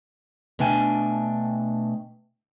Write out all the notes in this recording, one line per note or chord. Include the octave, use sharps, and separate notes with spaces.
B2 A3 D4 G5 G#5